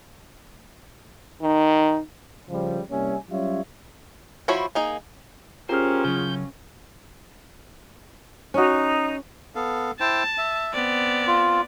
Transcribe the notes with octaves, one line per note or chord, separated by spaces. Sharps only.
D#3 D#4
C#3 F3 G3
C2 G3 A#3 C#4 E5 G#5
F#3 G3 C#4 F4 C#5 E5
F3 E4 F#4 C#5 B5
A#3 D#4 G#4
C#4 F4 G4 G#4 A#4 C5 F6
C#3 F#3 G6
C#4 D#4 F#4
B3 A4 F5
E4 C5 G5 A5
E5
B3 C4 D5
F4